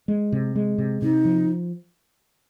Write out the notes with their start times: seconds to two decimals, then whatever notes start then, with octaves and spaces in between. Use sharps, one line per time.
0.08 G#3
0.32 C3
0.56 G#3
0.78 C3
1.02 C3 D#4
1.25 F3